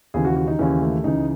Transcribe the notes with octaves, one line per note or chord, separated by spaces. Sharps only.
D#2 C#3 E3 G#4
F#4
F#4
D#4
D#2 C#3 E3 C#4
A3
C#2 C#3 E3 D#4